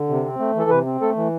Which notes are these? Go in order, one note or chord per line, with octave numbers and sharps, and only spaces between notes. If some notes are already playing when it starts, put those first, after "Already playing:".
Already playing: D3
C3
C4
A3
E3 A4
C3 B4
C4
A3 A4
E3